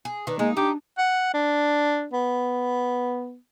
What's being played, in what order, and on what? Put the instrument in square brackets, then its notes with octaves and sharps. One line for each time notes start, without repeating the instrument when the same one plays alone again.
[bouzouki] G#4
[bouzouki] D#3 D4 [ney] B4
[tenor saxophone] G#3 [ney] A#3 [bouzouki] D#4
[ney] D4 [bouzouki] D#4 [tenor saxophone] G4
[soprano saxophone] F#5
D4
B3